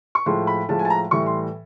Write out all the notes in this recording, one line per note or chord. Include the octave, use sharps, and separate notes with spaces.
C#6
A2 F3 G#3 C6
B5
A2 F3 G#3 A5
G#5
A5
A#5
A2 E3 G3 C#6
C6